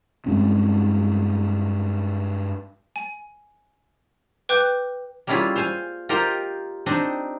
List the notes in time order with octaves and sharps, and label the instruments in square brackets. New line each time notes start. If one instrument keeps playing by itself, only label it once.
[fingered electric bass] G2 G#3 C4 C#4
[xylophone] G#5
B4 G5 D6 F#6 G6
[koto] G3 A#3 C#4 E4 F4 G#4
C5 F5 G#5
F4 G4 A#4 C5 D#5 A#5
C4 D4 D#4 D#5